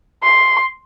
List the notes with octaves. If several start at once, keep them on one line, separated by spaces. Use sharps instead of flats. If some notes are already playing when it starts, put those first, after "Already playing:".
C6